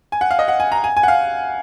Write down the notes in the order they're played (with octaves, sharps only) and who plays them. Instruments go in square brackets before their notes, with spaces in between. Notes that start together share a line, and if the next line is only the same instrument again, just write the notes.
[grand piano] G#5
F#5
F5
D#5
F#5
G#5
A#5
G#5
G#5
F#5
F5